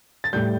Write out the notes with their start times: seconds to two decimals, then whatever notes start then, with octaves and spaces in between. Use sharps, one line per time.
0.24 A6
0.33 A2 G3 G6